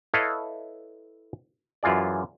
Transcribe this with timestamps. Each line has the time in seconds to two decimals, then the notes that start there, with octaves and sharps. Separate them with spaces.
0.14 E4 A4 B4 C#5 D#5 F5
1.83 F#2 E3 F4 G#4 D5